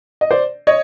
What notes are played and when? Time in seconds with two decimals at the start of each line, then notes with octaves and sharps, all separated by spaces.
0.21 D#5
0.30 C5 D5
0.67 C#5 D#5